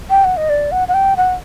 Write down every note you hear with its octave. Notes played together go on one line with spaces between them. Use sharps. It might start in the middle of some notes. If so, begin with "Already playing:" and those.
G5
F#5
D#5
D5
F#5
F#5
G5
F#5